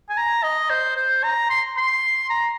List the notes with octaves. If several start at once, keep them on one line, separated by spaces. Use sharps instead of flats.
G#5
A#5
D#5
C5
C5
A#5
C6
C6
A#5